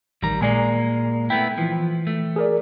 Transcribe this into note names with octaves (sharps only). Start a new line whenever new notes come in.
A1 D#3 G3 A#5
A#2 G#3 A#3 D5 G#5 A#5
A3 B3 E4 G5
E3 F3
A3
G#4 A#4 D5